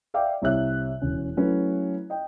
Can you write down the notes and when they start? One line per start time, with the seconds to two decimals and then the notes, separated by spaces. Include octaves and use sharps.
0.14 D5 E5 F5 G5 D6
0.42 C2 C3 C#5 E5 F#6
1.02 E1 C#4
1.37 F#3 A3 C#4 E4 B4
2.10 D#5 G5